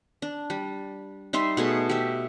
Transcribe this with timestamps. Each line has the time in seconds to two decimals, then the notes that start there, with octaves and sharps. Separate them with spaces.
0.22 D4
0.50 G3
1.33 G3 D#4 E5 C6
1.57 B2 A3 G#4
1.89 G4 E5